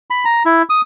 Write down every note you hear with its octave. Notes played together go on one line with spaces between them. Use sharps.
B5
A#5
E4
D#6